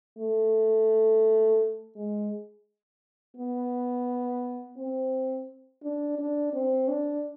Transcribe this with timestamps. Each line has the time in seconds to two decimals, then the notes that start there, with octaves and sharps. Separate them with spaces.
0.19 A3
1.96 G#3
3.37 B3
4.77 C4
5.84 D4
6.19 D4
6.53 C4
6.88 D4